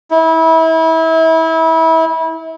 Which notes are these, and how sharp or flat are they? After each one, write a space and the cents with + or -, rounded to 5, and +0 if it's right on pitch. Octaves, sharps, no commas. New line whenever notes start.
E4 -30